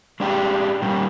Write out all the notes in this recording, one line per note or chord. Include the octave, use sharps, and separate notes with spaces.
G#3 D4 G4
A#2 G3 A#3